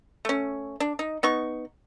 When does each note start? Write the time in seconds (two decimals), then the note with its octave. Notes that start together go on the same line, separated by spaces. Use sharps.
0.25 A3 C#4
0.80 D4
0.99 D#4
1.23 B3 D#4 C#6